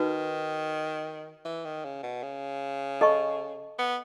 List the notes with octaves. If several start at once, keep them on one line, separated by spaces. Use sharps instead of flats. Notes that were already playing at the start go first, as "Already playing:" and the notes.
Already playing: D#3 D#4 F#4 B4
E3
D#3
C#3
B2
C#3
A4 D#5 A5 C#6
B3